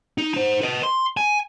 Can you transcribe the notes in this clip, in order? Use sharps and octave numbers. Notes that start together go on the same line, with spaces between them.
D#4
D#4 C5
B4 D#5
C6
G#5